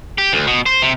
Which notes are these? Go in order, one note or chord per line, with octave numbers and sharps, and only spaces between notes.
G4
D2
B2
C5
C3